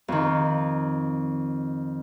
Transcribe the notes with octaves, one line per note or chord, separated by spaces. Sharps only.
F2 D#3